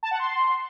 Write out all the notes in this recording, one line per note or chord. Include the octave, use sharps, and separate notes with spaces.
A5
F#5
C6